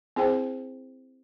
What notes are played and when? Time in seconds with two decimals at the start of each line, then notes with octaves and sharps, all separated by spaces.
0.16 C4 E4 G#4 C5 G5